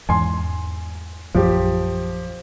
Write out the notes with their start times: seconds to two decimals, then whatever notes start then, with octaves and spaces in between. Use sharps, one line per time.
0.09 E2 G#2 G#5 C6
1.35 A#1 F#2 F3 G4